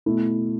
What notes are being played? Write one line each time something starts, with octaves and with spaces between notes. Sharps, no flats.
B2 A3 E4